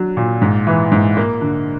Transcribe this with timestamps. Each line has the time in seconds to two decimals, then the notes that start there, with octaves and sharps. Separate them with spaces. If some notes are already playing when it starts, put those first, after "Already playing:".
Already playing: F#3 D4
0.17 A#2
0.42 G#2
0.67 E3
0.92 G#2
1.17 A#3
1.41 D3